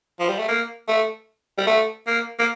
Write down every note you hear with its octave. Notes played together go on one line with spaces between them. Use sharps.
F3
G3
A3
A#3
A3
G3
A3
A#3
A#3